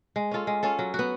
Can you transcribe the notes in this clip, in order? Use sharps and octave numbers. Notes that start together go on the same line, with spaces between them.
G#3
C#4 F4 A4
G#3
C#4 F4 A4
F#3
F#4
B3